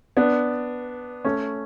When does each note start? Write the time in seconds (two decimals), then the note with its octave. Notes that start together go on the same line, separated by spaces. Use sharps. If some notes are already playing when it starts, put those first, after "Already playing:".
0.17 B3 D4
1.25 A3 C#4